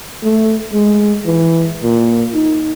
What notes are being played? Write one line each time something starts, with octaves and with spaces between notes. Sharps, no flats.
A3
G#3
E3
A#2
D#4